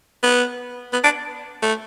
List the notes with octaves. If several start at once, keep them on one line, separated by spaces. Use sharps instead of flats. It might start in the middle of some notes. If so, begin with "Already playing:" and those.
B3
B3
D4
A3